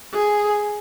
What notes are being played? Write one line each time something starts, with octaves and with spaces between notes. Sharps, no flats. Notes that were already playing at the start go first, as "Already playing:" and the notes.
G#4